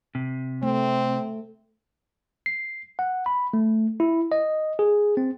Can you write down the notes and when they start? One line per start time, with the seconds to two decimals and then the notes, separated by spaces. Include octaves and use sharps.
0.15 C3
0.63 A3 C4
2.46 C7
2.99 F#5
3.26 B5
3.53 A3
4.00 E4
4.32 D#5
4.79 G#4
5.17 C4